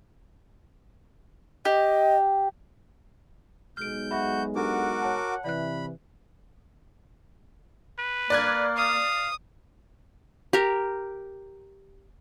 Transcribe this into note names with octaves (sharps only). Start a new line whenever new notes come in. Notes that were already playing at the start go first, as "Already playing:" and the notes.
G4 D#5
B1 G#3 F6 G6 D7
F#4 E5 B5
D4 F#4 G4 A4 A#4 F#5 D6
C#5 A5
C3 E3 D5 E5 B5 F#6
B4
A#3 D5 F#6 G#6
F5 D#6
G4 A#4